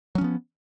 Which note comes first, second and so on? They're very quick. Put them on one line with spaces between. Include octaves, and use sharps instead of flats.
F#3 C#4 F3 B3